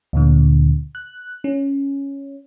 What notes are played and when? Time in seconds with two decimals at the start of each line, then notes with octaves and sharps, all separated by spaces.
0.13 D2 A#2 D3
0.95 F#6
1.44 C#4